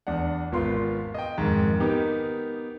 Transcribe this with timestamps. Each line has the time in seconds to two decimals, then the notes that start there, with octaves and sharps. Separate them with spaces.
0.07 E2 D4 F#5
0.52 G#1 B3 F4 A#4 C6
1.14 D#5 G5
1.38 F2 G#2 D#3
1.80 B3 D#4 G4 A#4